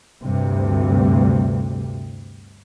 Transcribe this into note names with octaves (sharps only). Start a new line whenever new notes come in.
D2 G2 C3